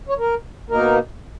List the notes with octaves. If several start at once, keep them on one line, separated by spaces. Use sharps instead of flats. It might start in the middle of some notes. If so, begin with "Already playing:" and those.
C#5
A#4
B2 A#3 D#4 A#4